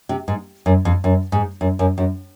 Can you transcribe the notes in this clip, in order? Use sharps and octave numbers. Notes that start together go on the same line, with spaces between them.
C3
G#2
F#2
F2
F#2
G#2
F#2
F#2
F#2